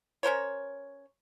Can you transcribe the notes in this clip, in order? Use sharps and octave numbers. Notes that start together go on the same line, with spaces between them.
C#4 A#4 C5 C#5